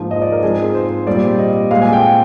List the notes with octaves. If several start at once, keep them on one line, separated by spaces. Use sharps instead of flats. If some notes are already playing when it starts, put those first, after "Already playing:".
Already playing: G#2 F3 A#3
D#5
D5
A#4
G#2 F3 G#3 C4 G#4
C5
A#2 G3 C4 D5
D#5
A#2 G#3 C4 F5
G#5
G5